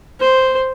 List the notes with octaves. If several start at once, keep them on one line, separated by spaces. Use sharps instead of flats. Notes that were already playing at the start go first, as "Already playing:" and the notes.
C5